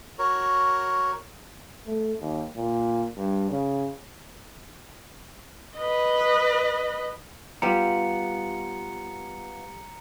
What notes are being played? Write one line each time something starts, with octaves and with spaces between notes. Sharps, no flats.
F#4 A#4 C#5
A3
D#2
A#2
G2
C#3
B4 D#5
G3 B3 F4 G4 A#5 C#7